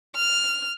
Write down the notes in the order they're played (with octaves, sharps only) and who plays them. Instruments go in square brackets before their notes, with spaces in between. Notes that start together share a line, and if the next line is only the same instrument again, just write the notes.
[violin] F6